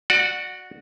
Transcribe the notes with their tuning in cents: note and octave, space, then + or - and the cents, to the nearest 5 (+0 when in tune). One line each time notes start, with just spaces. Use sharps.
F#4 -5 D5 +25 F#5 -20